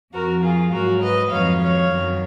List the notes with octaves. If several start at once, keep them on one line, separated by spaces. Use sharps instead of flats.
F2 F3 F#4 A#4
F4 G#4
G#2 F#3 F#4 A#4
B4 D#5
F2 D#3 F#3 C#5 F5
C#5 F5
F#2 D#3 F#3